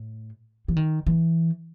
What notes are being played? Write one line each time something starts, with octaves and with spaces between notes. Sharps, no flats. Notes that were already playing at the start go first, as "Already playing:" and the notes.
Already playing: A2
E3
D#3
E3